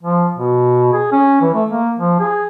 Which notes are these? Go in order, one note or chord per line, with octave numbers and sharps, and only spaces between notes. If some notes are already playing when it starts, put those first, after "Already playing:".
F3
B2
G#4
C#4
E3
A3
A#3
F3
G#4